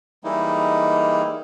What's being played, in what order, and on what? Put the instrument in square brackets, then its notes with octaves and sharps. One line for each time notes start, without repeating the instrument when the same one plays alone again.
[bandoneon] E3 G3 G#3 A#3 D#4 E4